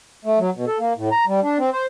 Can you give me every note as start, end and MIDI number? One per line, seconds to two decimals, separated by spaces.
0.25 0.39 57
0.39 0.50 54
0.55 0.65 47
0.67 0.78 69
0.79 0.93 58
0.96 1.09 45
1.12 1.25 82
1.27 1.40 55
1.43 1.58 62
1.59 1.70 60
1.73 1.86 72